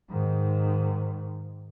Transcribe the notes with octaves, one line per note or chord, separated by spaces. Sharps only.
G#2 D#3